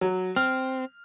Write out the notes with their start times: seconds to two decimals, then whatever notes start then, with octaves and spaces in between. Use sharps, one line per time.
0.01 F#3
0.36 C4 F6